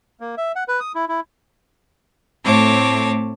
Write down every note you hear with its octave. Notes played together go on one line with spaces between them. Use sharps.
A#3
E5
F#5
B4
D#6
E4
E4
A2 A3 C4 C#5 A5 D6